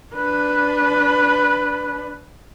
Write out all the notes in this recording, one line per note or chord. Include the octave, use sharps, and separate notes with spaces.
D4 B4